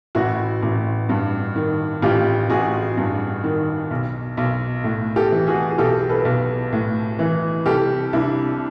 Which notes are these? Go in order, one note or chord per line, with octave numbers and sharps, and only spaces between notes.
A1 E4 F#4
A1
G2
D#3
A1 F4 G4
A1 F#4 G#4
G2
D#3
B1
B1
A2
G4 A4
E3
F#4 G#4
G#4
B1 G4 A4
A4 B4
B1
A2
E3
C2 G4 A4
C2 D4 E4